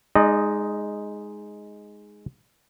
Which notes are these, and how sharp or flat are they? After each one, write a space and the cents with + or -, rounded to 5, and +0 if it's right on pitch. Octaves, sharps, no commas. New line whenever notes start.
G#3 +0 D#4 +0 D5 +40